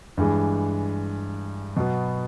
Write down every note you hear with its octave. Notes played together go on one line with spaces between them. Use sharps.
G2 E3 G#3
B2 F#3 B3